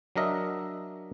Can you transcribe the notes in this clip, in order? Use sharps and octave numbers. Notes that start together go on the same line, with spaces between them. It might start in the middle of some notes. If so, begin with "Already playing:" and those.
F#3 D4 A#4 D#5 E5